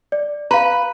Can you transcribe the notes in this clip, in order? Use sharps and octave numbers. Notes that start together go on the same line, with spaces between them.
D5
B4 F5 A#5